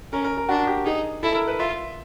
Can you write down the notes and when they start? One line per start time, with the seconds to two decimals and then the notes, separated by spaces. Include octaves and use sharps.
0.12 C#4 A#4
0.24 A#4
0.38 A#4
0.49 D4 F#4
0.67 G4
0.85 D#4 G#4
1.23 E4 A4
1.35 A#4
1.48 B4
1.59 F4 E5